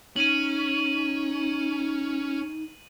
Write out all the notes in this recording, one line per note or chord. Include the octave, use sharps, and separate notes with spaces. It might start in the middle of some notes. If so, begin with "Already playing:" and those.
C#4 D#4 D#7 F#7